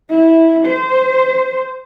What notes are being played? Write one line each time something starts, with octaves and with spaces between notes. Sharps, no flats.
E4
C5